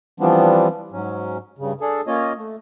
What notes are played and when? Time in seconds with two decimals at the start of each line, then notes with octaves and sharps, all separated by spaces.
0.20 E3 F3 G3 B3 C4 D4
0.92 G#2 F#3 C#4
1.59 G2 C#3
1.81 D4 G#4 A4
2.07 A#3 C#4 F4 C#5 D#5
2.37 A3